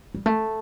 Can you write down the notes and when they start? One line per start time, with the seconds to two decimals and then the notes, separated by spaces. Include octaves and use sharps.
0.14 G3
0.26 A3